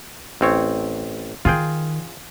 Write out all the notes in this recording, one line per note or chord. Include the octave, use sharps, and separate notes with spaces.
A1 C4 C#5
D#3 F4 G#4 G5